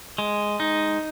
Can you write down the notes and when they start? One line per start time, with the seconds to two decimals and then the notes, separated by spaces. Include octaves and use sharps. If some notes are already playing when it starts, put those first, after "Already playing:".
0.18 G#3
0.60 D#4